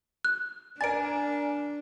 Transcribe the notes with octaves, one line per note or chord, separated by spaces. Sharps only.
F#6
D4 A#4 D5 G#5 A6 D7